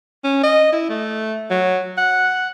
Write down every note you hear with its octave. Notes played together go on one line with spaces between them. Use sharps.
C#4
D#5
E4
A3
F#3
F#5